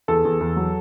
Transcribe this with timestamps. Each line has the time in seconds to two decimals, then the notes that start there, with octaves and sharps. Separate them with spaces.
0.08 E2 A4
0.25 E2
0.41 E2
0.56 F#3